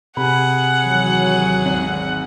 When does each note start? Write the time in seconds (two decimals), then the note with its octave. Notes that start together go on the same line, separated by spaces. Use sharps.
0.17 C3 G#4 F#5 B5
0.81 D#2 E3 F#3
1.65 G#1